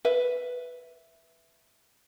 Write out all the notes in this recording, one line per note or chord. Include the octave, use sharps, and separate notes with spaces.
B4 E5